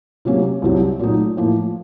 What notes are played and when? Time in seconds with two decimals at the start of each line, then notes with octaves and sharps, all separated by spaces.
0.25 C3 F#3 A#3 C#4
0.62 C2 C3 F#3
0.99 A#2 F#3 A3 D#4
1.37 A2 F3 A#3